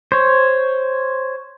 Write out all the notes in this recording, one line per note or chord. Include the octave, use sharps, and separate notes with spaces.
C5 C#5